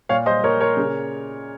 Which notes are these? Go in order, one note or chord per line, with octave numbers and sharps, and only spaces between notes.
A#2 C#5 F5
C5 D#5
A#2 A#4 C#5
A#4 C#5
C#3